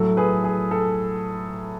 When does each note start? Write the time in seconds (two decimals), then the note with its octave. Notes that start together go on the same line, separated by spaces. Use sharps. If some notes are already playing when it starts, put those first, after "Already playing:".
Already playing: A2 F#3 A4
0.17 G#4 B4
0.44 G#4
0.71 A4